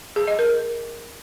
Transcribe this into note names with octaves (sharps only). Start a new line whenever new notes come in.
G#4
D#5
A#4